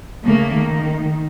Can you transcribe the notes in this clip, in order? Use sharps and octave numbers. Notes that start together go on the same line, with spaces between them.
C#3 A3 A#3
D#3